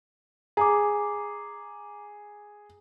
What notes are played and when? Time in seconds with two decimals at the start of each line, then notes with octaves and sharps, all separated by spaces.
0.57 G#4 A#5 D6